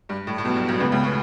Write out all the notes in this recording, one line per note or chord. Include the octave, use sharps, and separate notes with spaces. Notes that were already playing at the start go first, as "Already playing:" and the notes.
G2
A2
A2
B1 B2 B3
G2
B1 B2
C#2 C#3 B3
C#2 C#3
A2